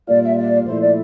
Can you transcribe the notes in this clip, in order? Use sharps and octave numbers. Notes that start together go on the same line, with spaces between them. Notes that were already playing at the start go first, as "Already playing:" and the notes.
A#2 G3 A#3 F4 D5
E5
D5
A#2 F3 A3 E4 C5
D5